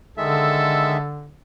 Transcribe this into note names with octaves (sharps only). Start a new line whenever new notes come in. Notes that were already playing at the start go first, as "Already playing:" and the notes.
D3 D#3 G#3 A4 E5